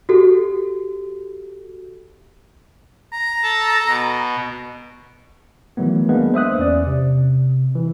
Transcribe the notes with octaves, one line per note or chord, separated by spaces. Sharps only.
F#4 G4 A4
A#5
A4 A5
B2
D#3 E3 F#3 A3 B3
G#3 A#3 B3 D4 B4
C5 E5 D#6 F#6
E2 C#4 D5
C3
E3